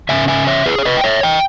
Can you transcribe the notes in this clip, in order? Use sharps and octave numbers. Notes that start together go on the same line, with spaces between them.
C#3 G#3 C#4 E5 G#5
E5 G#5
C#5 E5
G#4 B4
C#5
B4 D#5
G5
C#5 E5
D#5 G5